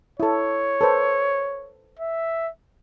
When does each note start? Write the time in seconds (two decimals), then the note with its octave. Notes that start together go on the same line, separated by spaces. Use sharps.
0.20 E4 A4 C#5
0.81 A4 B4 C5
1.99 E5